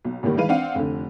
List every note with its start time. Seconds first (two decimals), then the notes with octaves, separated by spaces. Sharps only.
0.05 B1
0.23 A1 D#2 A2 D#3 G3
0.37 E3 G#3 B4 F5 D#7
0.49 C4 D4 F5 F#5
0.75 F1 D3